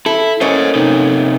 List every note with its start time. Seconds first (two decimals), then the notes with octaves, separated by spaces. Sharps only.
0.06 E4 A4
0.41 A3 A#3 C#4 C5 D#5
0.75 C3 D#4